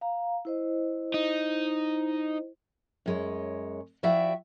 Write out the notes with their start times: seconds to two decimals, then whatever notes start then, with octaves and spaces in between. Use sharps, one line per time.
0.01 F5 A#5
0.45 E4 C5 D#5
1.14 D#4
3.06 F#2 G#3 C#5
4.03 F3 E4 F#4 D5 E5 G5